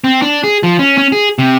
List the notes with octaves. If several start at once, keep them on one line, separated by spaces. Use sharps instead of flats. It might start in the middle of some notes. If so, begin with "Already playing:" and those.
C4
D4
G#4
F3
C#4
C#4
G#4
C3